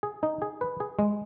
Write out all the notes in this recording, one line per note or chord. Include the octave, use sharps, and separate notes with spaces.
G#4
D#4
G#4
B4
G#4
G#3